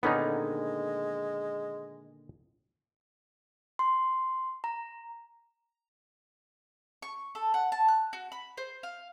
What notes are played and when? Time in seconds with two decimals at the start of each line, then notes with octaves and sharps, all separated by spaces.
0.03 A#2 D3 D#3 G#3 B3 C#4 D#4
3.79 C6
4.64 A#5
7.02 C#6
7.35 A4
7.54 F#5
7.72 A5
7.88 F#6
8.13 F#4
8.32 B5
8.57 C5
8.83 F5